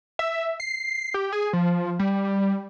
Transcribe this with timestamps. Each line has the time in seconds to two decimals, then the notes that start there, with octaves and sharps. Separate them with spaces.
0.19 E5
0.60 C7
1.14 G4
1.33 G#4
1.53 F3
1.99 G3